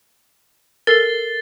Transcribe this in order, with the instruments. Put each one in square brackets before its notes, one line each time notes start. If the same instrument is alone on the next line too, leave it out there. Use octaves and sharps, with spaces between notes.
[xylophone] A4 A#4 [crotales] A6 C7 G7